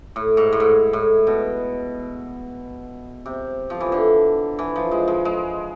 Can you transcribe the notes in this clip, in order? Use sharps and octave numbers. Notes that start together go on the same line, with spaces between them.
A2
G#2
A2
G#2
A2
B2
C3
F3
E3
D3
E3
F3
G#3
G#3
G#3